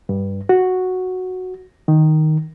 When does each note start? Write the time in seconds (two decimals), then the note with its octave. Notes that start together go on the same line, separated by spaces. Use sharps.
0.09 G2
0.49 F#4
1.88 D#3